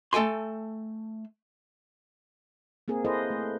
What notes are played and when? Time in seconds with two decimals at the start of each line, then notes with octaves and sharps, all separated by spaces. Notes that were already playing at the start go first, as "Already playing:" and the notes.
0.13 A3 A4 G5 G#5 C6
2.88 A#3 C4 G#4 A#4
3.05 E4 G#4 A4 B4 C5 D#5
3.30 A3